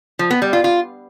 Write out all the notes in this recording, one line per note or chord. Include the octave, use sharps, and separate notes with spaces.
F3
B3
G3
F4
F4